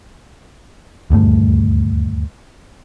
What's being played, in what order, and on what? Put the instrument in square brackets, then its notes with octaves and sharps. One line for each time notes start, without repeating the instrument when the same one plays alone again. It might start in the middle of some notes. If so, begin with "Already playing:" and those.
[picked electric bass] D#1 D2 G2 A3